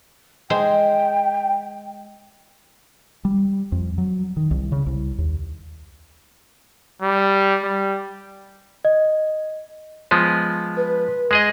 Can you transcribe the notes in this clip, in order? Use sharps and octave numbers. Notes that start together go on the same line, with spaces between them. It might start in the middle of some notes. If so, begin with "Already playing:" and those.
G#3 C5 G5 G#5
G3
F2
F#3
D#3
C2
C#3
C2
D#2
G3
G3
D#5
F3 G#3 B3
B4
G#3 G#4 D#5